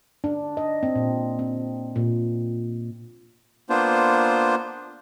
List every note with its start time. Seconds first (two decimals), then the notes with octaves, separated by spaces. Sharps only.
0.24 D4
0.57 D#5
0.83 C4
0.96 A#2
1.39 C4
1.96 A#2
3.70 A#3 B3 D4 F4 C5